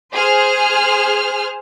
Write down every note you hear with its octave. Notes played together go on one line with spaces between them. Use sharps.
G#4 C5 F6